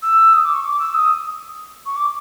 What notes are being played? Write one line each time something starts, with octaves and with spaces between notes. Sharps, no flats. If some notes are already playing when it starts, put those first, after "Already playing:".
E6
D#6
D6
C#6
D6
E6
D#6
C#6
D6